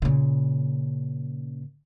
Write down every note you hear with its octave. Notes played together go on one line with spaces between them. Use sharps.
A#2 C#3